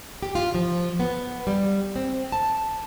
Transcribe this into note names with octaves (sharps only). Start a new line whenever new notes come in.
G4
F4
F3
B3
G3
C4
A5